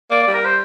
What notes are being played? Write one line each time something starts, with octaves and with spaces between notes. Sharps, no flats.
A#3 D5
D5
G3
A#4
C5